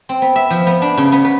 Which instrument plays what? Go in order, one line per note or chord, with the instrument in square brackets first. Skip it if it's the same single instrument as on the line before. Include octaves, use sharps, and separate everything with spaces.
[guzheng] C4
B3
E5
F3
B3
D4
C#3
B3
B4